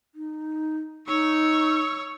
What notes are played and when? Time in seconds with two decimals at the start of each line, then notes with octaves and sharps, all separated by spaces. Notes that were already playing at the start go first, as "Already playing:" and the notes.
0.15 D#4
1.08 D#4 C#5 C#6 E6